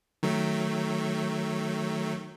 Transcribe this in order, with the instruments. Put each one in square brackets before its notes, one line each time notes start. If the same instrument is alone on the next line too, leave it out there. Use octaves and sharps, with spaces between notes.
[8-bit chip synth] D#3 F#3 A3